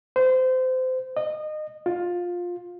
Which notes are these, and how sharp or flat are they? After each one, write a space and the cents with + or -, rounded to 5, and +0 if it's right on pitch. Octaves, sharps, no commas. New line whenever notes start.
C5 -25
D#5 -25
F4 +15